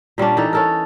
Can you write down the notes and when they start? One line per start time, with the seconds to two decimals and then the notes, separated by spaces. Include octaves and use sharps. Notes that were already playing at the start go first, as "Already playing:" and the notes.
0.18 A#2 G3 C#4 D4
0.37 E3 D#4 A4
0.53 C#4 A4 A#4